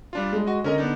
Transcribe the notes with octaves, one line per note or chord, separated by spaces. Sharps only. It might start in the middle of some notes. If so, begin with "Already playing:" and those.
G3 D4 F4
G#3
F#4 D#5
D3 C#4 A#4 D#5
B3 D4 D#4